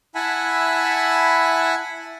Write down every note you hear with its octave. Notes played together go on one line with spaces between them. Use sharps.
E4 E5 F#5 G#5 A5 B5